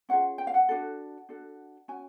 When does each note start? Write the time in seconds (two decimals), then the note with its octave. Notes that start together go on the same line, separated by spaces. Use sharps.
0.09 C#4 F4 G#4 F#5
0.38 G5
0.47 F5
0.54 F#5
0.69 D4 F#4 A4
1.29 D4 F#4 A4
1.88 C#4 F#4 G#5